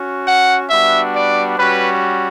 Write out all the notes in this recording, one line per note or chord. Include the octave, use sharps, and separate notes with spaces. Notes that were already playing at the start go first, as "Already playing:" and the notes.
Already playing: C#4 F#4
F#5
G3 B3 D4 F#4 E5
D5
G3 C#4 F#4 B4